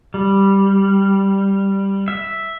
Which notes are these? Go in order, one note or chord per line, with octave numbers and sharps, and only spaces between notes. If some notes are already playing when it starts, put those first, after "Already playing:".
G3
E5